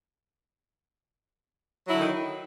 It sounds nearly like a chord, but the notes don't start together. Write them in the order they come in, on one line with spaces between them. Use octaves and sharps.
F#3 E4 D3 D#3